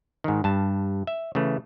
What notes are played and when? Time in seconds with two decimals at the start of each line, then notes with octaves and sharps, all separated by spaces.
0.24 G#2 D#3
0.44 G2 A5
1.07 E5
1.35 C#3 E3 A3